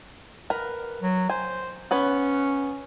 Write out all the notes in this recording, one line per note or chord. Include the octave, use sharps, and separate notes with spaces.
A#4 B4
F#3
C5 G#5
B3 C#4 B4 C#5